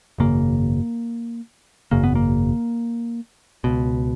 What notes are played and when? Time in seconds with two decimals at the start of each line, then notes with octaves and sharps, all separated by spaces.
0.18 G#1 F#2 C#3 A#3
1.91 G#1 F#2 C#3 A#3
2.04 B3
2.15 A#3
3.64 C#2 B2